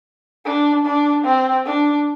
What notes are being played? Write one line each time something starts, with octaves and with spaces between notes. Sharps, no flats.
D4
D4
C4
D4